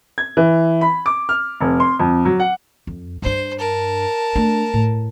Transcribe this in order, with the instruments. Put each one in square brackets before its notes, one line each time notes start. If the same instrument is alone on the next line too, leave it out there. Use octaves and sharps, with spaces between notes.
[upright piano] G#6
E3
B5
D6
F6
F1
C6
F2
F#3
F#5
[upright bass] F2
[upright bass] G2 D4 [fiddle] C5
[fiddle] A#4 A5
[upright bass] A3 D4
A2